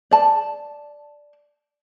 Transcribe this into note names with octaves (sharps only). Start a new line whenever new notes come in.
D5 A5